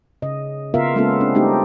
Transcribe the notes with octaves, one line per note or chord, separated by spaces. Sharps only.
C#3 D#5
C#3 B3 F4 A#4 E5 F5
G#3 A#3 B3 C#4 F4 A4
C4 D4
G3 A3 C4 D4 D#4 G4